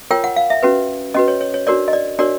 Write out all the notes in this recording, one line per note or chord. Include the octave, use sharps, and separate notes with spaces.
F4 A#4 C#5 G5
F#5
F5
E5
C#4 F#4 B4
C#4 F#4 B4 D#5
C#5
C#5
C#5
D4 F#4 A#4 C#5 D5
D#5
D5
D4 F#4 A#4 C#5 D5